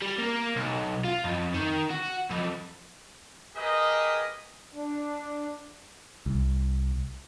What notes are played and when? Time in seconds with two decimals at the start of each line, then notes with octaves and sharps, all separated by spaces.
0.02 G3
0.19 A#3
0.56 B1
1.04 F4
1.24 F2
1.54 D#3
1.90 F#4
2.30 F2
3.56 G4 G#4 A#4 B4 D#5
4.74 D4
6.26 C2